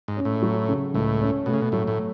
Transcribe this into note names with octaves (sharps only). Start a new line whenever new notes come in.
G#2
C#4
A2
F#3
C#3
C#2 A2
C#4
B2 A3
C#3
B2
A2 F#3
A2